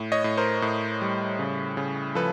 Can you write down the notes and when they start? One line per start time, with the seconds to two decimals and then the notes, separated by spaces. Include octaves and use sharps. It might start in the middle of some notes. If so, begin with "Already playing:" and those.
Already playing: A2
0.12 C#5 D#5
0.24 A2
0.37 A#4 C5
0.62 A2
1.02 G3
1.39 C#3
1.77 C#3
2.15 F3 A4 B4